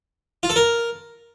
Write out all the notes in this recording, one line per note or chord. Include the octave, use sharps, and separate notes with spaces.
F4
A4
A#4